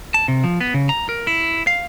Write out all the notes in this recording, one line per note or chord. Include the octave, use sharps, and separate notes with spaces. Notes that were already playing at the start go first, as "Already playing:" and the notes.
A5
C3
F3
B3
C#3
A#5
A#4
E4
F5